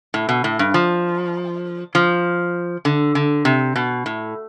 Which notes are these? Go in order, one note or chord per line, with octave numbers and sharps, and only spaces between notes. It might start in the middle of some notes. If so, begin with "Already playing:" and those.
A2
B2
A2
G2
F3
F3
D3
D3
C3
B2
A2